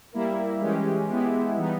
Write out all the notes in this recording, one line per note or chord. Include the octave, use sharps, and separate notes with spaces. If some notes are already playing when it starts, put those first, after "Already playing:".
G3 A#3 E4 A#4
E3 G#3 C#4 G4
G#3 B3 E4 G4
E3 G3 B3 D#4